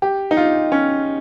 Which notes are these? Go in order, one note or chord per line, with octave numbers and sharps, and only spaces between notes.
G4
D#4
F4
C#4